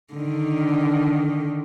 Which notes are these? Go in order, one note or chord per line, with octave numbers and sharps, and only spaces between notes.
D3 D#3